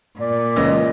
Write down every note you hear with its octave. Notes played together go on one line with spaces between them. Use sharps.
A#2 D5
C#2 E3 D#5